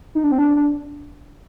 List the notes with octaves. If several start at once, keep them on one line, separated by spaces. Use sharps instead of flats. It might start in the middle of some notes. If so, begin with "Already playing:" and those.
D#4
D4
C4
D4
D4